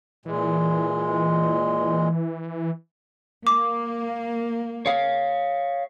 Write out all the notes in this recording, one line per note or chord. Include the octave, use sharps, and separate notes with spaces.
A#2 E3 G#3
A#3 D6
C#5 F5